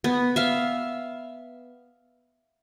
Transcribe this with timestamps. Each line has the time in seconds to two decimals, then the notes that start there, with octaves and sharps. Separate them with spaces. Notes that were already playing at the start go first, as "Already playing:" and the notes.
0.04 B3
0.36 E5 F5